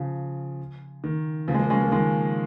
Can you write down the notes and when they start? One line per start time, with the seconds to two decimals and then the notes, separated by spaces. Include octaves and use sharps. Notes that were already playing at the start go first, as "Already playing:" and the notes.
Already playing: C#3 F3
1.04 D#3
1.48 C#3 F3
1.54 G#3
1.59 F3 A#3
1.70 G#3 C#4
1.81 F3 A#3
1.92 D#3 G#3